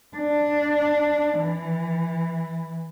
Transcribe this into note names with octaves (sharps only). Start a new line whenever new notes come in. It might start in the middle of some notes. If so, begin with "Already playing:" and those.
D4
E3